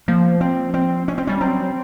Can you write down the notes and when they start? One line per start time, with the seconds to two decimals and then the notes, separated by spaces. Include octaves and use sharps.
0.08 F3 A#3
0.41 C4
0.74 C4
1.08 C#4
1.18 C4
1.27 G3 C#4
1.41 F#3 C4